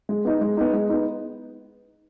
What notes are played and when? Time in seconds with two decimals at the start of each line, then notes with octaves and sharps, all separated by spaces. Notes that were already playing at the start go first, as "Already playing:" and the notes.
0.09 G#3
0.25 B3 D#4
0.41 G#3
0.57 B3 D#4
0.73 G#3
0.89 B3 D#4